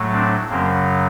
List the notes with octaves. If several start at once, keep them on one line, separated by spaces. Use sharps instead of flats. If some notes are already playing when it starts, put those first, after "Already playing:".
Already playing: A2 F#3 A3
C4 D4
F#2 C#3 F#3 A#3 C4